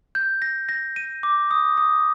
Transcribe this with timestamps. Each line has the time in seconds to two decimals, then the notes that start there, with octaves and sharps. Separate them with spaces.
0.15 G6
0.42 A#6
0.69 A#6
0.96 D#7
1.23 D6
1.51 D#6
1.77 D#6